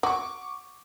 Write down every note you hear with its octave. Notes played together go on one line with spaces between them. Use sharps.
F#4 C#6 D6